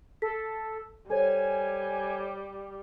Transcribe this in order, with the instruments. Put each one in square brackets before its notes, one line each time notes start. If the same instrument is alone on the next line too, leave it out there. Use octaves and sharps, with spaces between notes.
[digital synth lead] A4 [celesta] B6
[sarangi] G3 [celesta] A4 C5 C#5 [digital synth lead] G#5